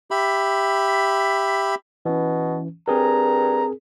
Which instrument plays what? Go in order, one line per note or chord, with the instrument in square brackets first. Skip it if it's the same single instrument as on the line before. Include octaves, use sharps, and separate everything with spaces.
[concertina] G4 E5 B5
[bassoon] B2 [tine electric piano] E3 C#4
[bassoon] G2 [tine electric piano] C4 G#4 A#4 [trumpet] A#5